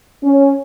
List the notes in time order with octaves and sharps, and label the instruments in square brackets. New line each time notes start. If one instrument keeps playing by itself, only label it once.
[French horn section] C#4